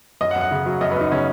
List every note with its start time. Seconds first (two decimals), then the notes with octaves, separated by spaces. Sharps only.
0.21 F#2 D#5
0.31 F#5
0.36 F#2
0.41 F#5
0.51 C#3
0.66 F#3
0.81 F#2 D#5
0.91 B4
0.96 F#2 D#4
1.11 C#3 C#4